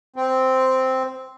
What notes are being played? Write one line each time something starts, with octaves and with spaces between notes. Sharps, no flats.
C4